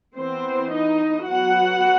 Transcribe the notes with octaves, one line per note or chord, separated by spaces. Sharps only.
E3 B3 C4 C5
D#4 D#5
F#3 B3 F#4 F#5